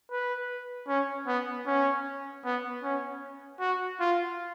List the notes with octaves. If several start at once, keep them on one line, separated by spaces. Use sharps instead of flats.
B4
C#4
B3
C#4
B3
C#4
F#4
F4